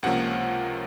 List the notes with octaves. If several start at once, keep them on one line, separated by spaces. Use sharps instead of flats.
C#2 C3 F3 A#3 C#4 F#5